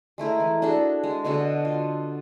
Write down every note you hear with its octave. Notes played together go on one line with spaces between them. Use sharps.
G#3 A3 E4 A#4
E3
D4 F#4 G#4 A4
G#3
B2 D3 F#4 A4
F4